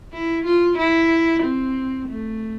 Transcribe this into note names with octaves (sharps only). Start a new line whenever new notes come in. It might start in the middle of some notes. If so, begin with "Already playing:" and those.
E4
F4
E4
C4
A3